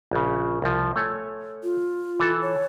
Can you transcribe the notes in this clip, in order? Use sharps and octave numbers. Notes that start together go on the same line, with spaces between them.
A#1 C#3
C2 F3
A3 C#5 G#5
F4
E3 A4 A5
C#5